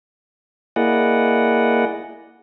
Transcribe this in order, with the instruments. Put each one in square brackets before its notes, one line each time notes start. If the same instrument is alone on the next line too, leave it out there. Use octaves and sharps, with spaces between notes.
[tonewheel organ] A#3 E4 G#4 D5 D#5 F#5